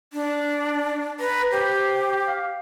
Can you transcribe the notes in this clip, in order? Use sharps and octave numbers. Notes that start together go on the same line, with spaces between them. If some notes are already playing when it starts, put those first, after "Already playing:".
D4
B4 A#5
G4 C5
F5